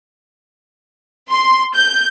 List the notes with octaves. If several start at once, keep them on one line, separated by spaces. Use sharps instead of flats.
C6
G6